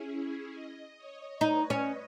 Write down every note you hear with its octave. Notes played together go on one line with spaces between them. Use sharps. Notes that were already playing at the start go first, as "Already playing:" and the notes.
Already playing: C#4 E4 G#4
D#5
C#5
D#4 B4
C#4